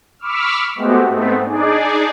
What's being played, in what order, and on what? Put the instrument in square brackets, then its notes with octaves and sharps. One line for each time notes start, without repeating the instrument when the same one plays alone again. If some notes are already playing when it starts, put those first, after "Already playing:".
[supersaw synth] B5 C#6 D6 E6 F6
G#3 A3 B3 C4 F#4 G4
G#2 A3 B3 C4
D4 D#4 G#4 D5